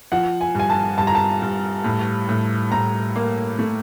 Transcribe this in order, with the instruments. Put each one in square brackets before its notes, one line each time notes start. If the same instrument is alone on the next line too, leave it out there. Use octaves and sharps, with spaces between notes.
[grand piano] F3 [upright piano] F#5
[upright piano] G#5
[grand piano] G2 [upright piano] G#5
[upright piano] A5
[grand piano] G2 [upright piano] A5
[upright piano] A#5
A5
[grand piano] G2
A2
A2
[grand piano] A2 [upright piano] A#5
[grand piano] A#3
A3